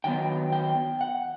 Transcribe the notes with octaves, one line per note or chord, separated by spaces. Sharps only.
D#3 F#3 B3 G5
G5
F#5